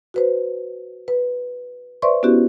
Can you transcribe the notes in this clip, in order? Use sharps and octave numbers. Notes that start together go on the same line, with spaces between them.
F#4 B4 C5
B4
B4 C5 D5 E5 C6 C#6
B3 C#4 E4 F#4 G4